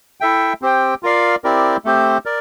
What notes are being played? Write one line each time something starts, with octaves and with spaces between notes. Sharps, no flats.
E4 A4 E5 G5
C4 G4 C5 G5
F4 A#4 D5 F5
C4 E4 G4 A#4 D5
A3 C4 G4 C5
A#4 D5